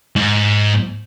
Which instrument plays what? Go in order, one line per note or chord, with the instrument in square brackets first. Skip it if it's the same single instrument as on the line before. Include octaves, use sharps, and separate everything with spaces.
[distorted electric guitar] G#2